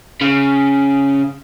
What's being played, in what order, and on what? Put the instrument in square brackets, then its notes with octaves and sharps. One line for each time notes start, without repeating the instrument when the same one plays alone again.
[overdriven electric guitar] C#3